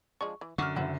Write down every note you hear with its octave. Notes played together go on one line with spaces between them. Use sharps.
F3 G#3 D4 C#6
E3
F#2 D3 F#4 C#6 D6 F6
F#1 F#2 C4 E4 F#4